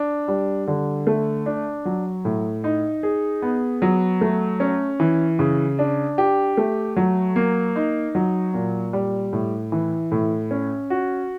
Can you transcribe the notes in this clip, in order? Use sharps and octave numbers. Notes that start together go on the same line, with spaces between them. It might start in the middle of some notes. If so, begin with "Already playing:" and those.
Already playing: D4
G3
D3
A3
D4
F#3
A2
D#4
G#4
B3
F#3
A3
C#4
E3
C#3
D4
G4
A3
F#3
A#3
D#4
F#3
A#2
G3
A2
E3
A2
C#4
F#4